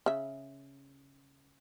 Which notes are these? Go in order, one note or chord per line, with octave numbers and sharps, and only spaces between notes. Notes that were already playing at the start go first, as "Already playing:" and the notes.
C#3 E5